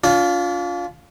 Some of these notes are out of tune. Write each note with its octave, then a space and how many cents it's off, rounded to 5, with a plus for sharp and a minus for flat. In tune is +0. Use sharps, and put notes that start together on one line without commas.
D4 -45 F4 +10